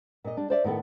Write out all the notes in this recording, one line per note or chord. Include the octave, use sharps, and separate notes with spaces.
A#2 D#5
G3 D4
C5 D5 E5
A2 D#3 B3 A4